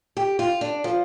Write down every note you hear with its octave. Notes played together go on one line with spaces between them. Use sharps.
G4
F4
D4
F3